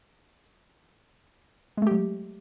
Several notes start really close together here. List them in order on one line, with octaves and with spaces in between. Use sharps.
G#3 A3 G4 F#3